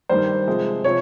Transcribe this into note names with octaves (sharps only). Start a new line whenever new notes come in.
G2 D#3 G3 C5
C3 F3 G#3
C3 F3 C#5